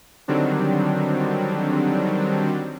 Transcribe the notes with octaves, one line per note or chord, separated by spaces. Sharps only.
D3 D#3 F#3 G3 C4 D4